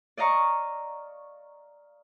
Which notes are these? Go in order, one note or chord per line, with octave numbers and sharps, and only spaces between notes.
D5 D#5 F5 A#5 C#6